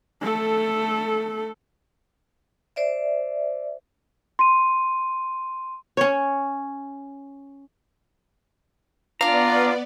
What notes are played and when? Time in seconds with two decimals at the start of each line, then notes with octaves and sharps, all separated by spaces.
0.22 A3 A4
2.76 C5 D5 E5
4.39 C6 D#7
5.97 C#4 C#5
9.21 B3 D4 F4 D5 F5 A#5